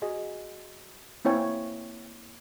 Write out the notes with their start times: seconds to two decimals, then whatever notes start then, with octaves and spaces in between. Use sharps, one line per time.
0.02 F#4 G#4 D#5
1.25 A#3 C4 E4 C#5 G5 G#5